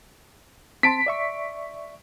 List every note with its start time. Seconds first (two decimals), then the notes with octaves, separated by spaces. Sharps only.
0.83 C4 A5 C6 B6 D7
1.06 D5 E5 C#6